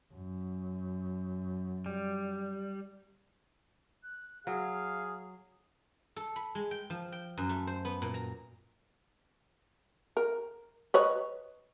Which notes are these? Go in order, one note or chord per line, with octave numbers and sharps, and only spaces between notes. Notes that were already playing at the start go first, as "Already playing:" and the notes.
F#2
G3
F#6
F#3 G#4 F5
A4
B5
G#3
G5
F3
G5
F#2
A3
C5
B3
A#2
A#5
A#4
B4 C#5 D#5